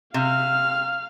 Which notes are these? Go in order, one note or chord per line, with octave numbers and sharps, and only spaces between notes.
C3 F5 F6